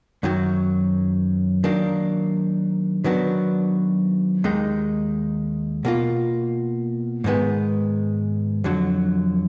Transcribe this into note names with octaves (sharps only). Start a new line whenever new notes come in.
F#2 D#3 F#3
D#3 F#3 A#3 D4
D#3 F#3 B3 D4 F#4
D#2 D#3 G#3 D#4
B2 A#3 F4
G#2 D#3 G#3 B3
F2 D3 F#3